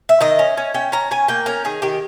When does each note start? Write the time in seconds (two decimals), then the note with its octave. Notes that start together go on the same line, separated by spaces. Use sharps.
0.09 E5
0.21 D#3 D#5
0.39 C#4
0.57 C#4
0.74 C#4 G5
0.92 C#4 A#5
1.11 C#4 G#5
1.28 A#3 G5
1.46 C#4 A#4
1.64 D#3 G#4
1.82 D#3 G4